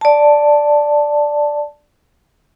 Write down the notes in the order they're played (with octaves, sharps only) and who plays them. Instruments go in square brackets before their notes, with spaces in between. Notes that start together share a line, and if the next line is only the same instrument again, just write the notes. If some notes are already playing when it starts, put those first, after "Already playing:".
[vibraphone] D5 A5